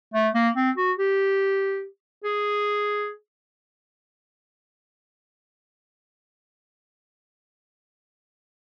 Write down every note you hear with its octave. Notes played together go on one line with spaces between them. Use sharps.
A3
A#3
C4
F#4
G4
G#4